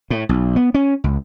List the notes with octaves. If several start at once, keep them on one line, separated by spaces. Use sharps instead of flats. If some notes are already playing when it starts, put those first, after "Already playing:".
A2
B1
B3
C#4
C#2